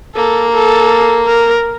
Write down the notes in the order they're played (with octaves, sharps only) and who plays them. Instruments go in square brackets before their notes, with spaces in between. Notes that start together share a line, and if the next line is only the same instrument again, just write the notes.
[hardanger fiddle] A#3 [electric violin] A4
[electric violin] A4
A#4